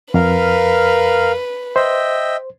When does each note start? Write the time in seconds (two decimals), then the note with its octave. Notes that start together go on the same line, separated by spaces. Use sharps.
0.14 F2 A#4 B4 F5
1.76 C5 D#5 E5 G5